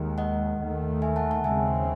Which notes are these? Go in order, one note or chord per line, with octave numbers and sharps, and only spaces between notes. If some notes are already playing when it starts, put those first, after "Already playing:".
Already playing: D#2 D#3 G#3
D#5 F#5
D#2 D#3 A3
E5 G#5
F#5 A5
F#5 A5
D#2 C#3 G#3 C4 E5 G#5